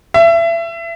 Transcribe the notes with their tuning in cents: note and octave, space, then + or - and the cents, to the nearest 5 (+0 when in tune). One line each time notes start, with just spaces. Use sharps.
E5 +30